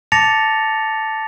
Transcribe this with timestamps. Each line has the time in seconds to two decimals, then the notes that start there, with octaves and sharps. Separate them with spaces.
0.12 A5 D6 A6 A#6 C#7 F7